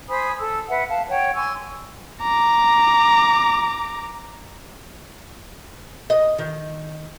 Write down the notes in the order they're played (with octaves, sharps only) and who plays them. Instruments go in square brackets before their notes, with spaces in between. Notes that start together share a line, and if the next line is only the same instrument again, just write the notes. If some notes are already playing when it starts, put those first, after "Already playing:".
[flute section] C5 G#5 B5 D#6
A4 E6
B4 E5 F#5
F5 A5
C#5 F#5 G5
G#5 C6 C#6 E6
[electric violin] A#5 D6
[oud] D#5
D#3